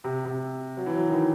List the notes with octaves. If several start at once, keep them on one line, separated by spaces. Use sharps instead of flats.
C3
C3
F#3
E3
F#3
D#3
E3